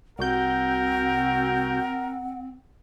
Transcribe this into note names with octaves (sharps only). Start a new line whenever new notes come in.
C2 C4 F#4 A#4 F#5 G6